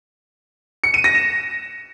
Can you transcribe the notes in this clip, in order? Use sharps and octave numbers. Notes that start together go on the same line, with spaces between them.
C#7
D#7
A#6
E7